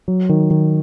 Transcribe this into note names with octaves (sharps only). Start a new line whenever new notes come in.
F#3
D#3
D#3